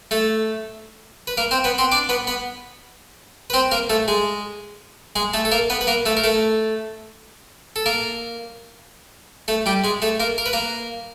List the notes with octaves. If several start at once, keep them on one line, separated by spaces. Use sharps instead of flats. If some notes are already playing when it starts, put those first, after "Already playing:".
A3 A4
B4
A#3 A#4
C4 C5
B3 B4
C4 C5
D4 D5
B3 B4
B3 B4
B4
C4 C5
A#3 A#4
A3 A4
G#3 G#4
G#3 G#4
A3 A4
A4
A#3 A#4
B3 B4
B4
A#3 A#4
A3 A4
A#4
A3 A4
A4
A#3 A#4
A3 A4
G3 G4
G#3 G#4
A3 A4
A#3 A#4
A#4
B4
A#3 A#4